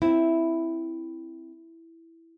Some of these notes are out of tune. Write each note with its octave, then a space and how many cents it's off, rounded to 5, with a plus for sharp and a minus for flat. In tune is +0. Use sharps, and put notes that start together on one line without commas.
C4 +0 E4 +0